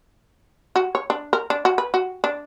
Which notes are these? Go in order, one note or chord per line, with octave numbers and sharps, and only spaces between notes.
F#4
C#5
D4
A#4
D4
F#4
B4
F#4
D4